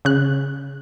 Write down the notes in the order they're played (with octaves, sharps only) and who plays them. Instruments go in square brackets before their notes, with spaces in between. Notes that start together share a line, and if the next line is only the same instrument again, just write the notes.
[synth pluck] C#3 F#6